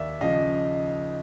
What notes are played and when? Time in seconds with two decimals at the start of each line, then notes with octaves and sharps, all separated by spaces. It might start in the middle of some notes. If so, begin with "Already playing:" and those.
Already playing: D#2 D5 E5
0.21 C#3 F3 D#5 F5